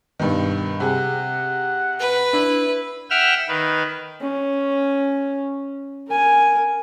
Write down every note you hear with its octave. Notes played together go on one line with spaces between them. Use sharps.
G2 B2 D#3
C3 G#4 F#5
B4
D4 E4
E5 F#5 G5 E6 F6
D#3 B4
C#4
A#4 G#5